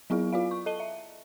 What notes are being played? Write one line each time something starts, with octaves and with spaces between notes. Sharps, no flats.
F#3 B3 E4 G#4 F5
F4 D5 F5
C#6
A4 D#5 A5 D#7 G7
E5